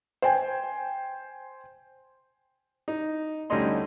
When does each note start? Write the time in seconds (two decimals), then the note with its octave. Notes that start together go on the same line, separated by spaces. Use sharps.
0.22 C5 G5 G#5
2.88 D#4
3.50 D2 G3 C#4 D#4 D#5 C6